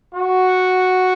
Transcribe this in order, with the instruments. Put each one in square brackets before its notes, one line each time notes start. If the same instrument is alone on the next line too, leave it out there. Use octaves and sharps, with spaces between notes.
[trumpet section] F#4